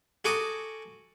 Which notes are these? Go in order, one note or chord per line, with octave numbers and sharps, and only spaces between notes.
F#4 A4 G#5 A#5 D6 D#6